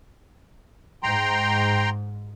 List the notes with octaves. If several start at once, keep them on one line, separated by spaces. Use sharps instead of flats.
G#2 G5 A#5 C6